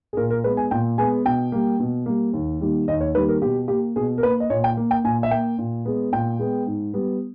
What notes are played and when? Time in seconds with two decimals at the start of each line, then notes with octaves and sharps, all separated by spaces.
0.13 G#4
0.17 A#2 A#4
0.30 A#4
0.44 G#3 B4
0.47 B3
0.57 G#5
0.71 A#2 G5
0.98 G#3 B3 G#5
1.25 B2 G5
1.52 G3 A#3
1.80 B2
2.06 G3 A#3
2.33 D#2
2.60 D#3 G3 A#3
2.88 D#2 D#5
3.01 C#5
3.14 D#3 G3 A#3 B4
3.29 A#4
3.42 B2 G4
3.68 A#3 G4
3.96 B2 G#4
4.18 A#4
4.23 A#3 B4
4.40 D#5
4.50 A#2 C#5
4.64 G5
4.77 A#3
4.91 G5
5.04 A#2 G#5
5.23 E5
5.31 A#3 G5
5.58 A#2
5.85 G#3 B3
6.12 A#2 G5
6.39 G#3 B3
6.67 G#2
6.94 G3 B3